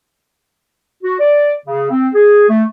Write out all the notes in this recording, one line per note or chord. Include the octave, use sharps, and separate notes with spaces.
F#4
D5
C#3
C4
G#4
A3